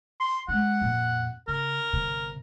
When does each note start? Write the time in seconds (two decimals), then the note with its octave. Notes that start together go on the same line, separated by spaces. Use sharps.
0.20 C6
0.48 G#3 D4 F#5
0.82 F2 A#2
1.48 C#3 A#4
1.93 G1 C3